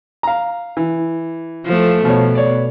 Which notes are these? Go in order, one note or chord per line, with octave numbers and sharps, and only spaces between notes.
F5 A#5
E3
F3 A3
B2 F3 C#5
C#5 D5